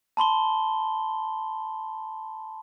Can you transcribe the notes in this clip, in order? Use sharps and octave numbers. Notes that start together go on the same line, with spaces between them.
A5 B5 C6 G7